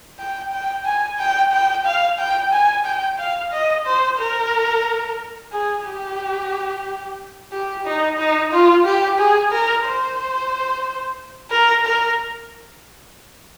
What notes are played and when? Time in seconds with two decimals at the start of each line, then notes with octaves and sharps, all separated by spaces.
0.19 G5
0.52 G5
0.85 G#5
1.18 G5
1.52 G5
1.85 F5
2.18 G5
2.52 G#5
2.85 G5
3.18 F5
3.52 D#5
3.85 C5
4.18 A#4
5.52 G#4
5.85 G4
7.52 G4
7.85 D#4
8.18 D#4
8.51 F4
8.85 G4
9.18 G#4
9.51 A#4
9.85 C5
11.51 A#4
11.85 A#4